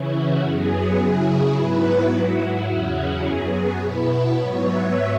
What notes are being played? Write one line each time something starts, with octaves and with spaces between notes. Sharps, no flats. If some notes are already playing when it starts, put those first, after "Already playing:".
Already playing: C#3 E3 C#4 E4
F#4
F#2 F#3 B3 G#4
C#3 F#3 E4
G#2 F#3 B3 E4 B4
F#4
G#2 F#3 E4 F#4
E4
E2 C#3 F#3 C#4 E4 F#4
G#4
F#2 F#3 B3 G#4
B2 B3 E4 B4
G#2 F#3 B3 C#5
E5